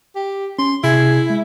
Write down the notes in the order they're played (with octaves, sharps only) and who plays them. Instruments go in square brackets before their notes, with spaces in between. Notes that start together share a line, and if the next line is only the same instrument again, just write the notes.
[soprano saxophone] G4
[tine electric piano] C#4 [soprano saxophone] C6
[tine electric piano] C3 G#6 [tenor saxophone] E4 [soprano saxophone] G#4
[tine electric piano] G#3